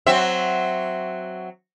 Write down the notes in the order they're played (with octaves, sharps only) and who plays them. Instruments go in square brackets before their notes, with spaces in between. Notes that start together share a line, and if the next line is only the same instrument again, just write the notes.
[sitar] F#3 C4 E5